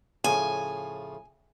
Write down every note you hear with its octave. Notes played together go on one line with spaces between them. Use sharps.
A2 C#3 F3 G#5